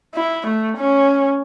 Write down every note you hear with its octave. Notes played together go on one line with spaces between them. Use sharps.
E4
A3
C#4